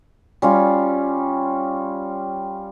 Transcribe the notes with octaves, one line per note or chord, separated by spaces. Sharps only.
G3 C#4 F4